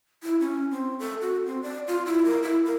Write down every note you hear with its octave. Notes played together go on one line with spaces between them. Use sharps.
E4
C#4
C4
A4
F#4
C4
D5
F4
E4
A#4
E4
A#4